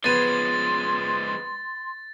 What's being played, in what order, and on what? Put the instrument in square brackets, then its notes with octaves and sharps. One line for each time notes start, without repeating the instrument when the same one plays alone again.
[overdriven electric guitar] F3 G#3 [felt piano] B3 D#7 [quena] C6 [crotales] A6